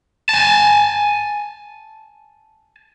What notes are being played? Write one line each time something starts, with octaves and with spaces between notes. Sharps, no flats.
G#5 A5